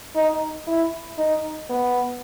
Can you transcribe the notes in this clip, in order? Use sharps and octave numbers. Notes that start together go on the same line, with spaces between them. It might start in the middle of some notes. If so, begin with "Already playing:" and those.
D#4
E4
D#4
B3